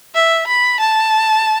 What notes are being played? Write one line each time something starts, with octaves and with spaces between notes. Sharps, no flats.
E5
B5
A5